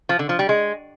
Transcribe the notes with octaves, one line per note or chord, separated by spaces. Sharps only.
F3
D3
F3
G3
G#3